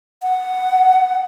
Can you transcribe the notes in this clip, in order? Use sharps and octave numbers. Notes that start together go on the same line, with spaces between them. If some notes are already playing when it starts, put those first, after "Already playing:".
F#5